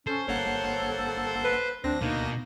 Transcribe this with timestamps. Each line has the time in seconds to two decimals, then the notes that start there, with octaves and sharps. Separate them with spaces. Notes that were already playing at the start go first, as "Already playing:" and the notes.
0.07 C#4 A4 C5
0.28 G1 A#3 A4 C#5 F#5
1.44 B4
1.84 D2 C4 D4 A#6
2.02 B2 A#3 D#4